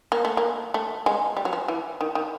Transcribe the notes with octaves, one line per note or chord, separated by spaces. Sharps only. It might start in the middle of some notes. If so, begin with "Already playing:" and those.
A#3
A3
A#3
A3
G#3
G3
F#3
F3
E3
D#3
D#3